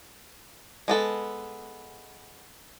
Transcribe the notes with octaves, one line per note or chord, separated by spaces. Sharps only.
G#3 B3 A4